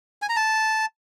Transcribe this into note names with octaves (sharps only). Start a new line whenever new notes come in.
G#5
A#5
A5